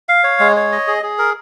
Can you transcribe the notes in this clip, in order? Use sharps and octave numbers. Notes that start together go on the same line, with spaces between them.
F5
C#5
G#3
C#5
D#5
G#4
G#4
A#4